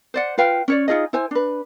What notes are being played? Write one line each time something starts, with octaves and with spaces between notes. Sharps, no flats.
C5 D5 F#5
F4 B4 F5 G5
C#4 C#5 D5
D#4 F4 G#4 D#5
E4 C5 G#5
D4 B4